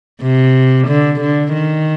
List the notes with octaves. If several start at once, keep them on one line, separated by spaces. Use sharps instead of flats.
C3
D3
D3
D#3